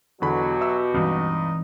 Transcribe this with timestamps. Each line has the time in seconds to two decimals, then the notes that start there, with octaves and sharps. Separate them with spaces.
0.22 E2 B2 D3 F#3 F#4 G4 B5
0.61 E5 E6
0.94 G2 E3 G#3 C4 D#4